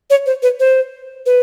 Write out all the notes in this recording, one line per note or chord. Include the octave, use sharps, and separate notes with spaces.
C#5
C5
B4
C5
B4